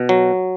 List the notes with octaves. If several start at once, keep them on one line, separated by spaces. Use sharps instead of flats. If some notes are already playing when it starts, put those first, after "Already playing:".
Already playing: B2
F#3